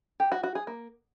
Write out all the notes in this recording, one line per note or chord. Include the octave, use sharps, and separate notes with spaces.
G4
F#4
F#4
G#4
A#3